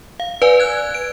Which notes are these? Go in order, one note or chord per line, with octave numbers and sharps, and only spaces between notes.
F5
B4 D5 G#5
F#6 G#6
D7